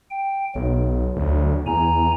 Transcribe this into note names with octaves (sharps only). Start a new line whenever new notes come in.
G5
B1 F#3
D2
E2 G#5 A#5